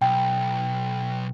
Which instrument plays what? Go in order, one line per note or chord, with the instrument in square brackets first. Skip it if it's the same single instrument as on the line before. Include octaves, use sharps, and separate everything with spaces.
[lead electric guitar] B1 [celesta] G5